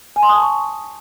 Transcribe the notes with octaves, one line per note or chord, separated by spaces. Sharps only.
G#5
C6
D#6
A5
C#6